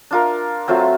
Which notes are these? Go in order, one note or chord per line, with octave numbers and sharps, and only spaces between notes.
D4 F4 A#4
F#3 A3 C4 F4